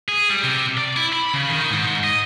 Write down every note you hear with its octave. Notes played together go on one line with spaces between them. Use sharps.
G#4
G3
C3
D5
E4
B5
C#3
D#3
G#2
D#5